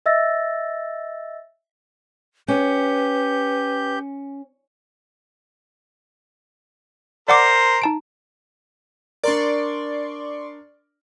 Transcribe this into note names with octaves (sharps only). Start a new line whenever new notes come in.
D#5 E5 E6 A6 A#6
C#4 G4 B4 G6
A#4 C5 D5 F#5 D6
D#4 A5 D7
D4 A#4 D5 C6 C#6